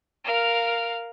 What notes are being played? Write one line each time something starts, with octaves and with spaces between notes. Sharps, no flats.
A#4 F5